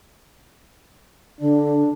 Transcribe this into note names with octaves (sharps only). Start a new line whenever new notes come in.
D3 D4